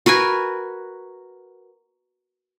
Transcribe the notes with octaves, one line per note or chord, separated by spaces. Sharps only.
F#4 A#4 B4 G#5